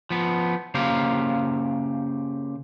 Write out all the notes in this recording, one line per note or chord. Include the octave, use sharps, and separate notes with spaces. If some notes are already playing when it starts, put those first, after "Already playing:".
F3 B3
C#3 A#3 G4 C5 F5